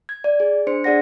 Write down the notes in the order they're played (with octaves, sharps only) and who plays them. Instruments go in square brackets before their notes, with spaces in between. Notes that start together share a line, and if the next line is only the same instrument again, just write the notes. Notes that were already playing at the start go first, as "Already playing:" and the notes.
[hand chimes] G#6
D5
G#4
D4 C5 C#7
D4 G#4 D5 F#5 A#6